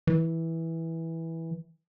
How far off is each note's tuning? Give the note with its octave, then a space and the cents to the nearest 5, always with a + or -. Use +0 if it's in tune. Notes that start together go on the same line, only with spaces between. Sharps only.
E3 -10